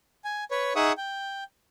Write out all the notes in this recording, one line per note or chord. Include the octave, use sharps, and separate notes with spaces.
G#5
B4 C#5
D#4 G#4 E5 F#5 C#6 D#6
G5